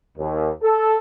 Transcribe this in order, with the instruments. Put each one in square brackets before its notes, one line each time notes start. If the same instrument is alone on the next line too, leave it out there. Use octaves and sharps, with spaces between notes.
[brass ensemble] D#2
A4